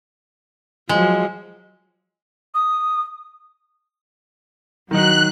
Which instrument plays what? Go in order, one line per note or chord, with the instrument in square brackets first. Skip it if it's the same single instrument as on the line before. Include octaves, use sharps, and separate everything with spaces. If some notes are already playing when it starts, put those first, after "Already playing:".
[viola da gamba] F3 F#3 [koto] G#3
[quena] D#6
[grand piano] D#3 D#4 [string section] F#3 [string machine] F#6